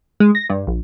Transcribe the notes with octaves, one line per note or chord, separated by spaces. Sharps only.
G#3
A#6
G2
A#1